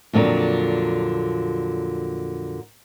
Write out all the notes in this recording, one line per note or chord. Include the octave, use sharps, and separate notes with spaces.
F2 A#2 D3 F#3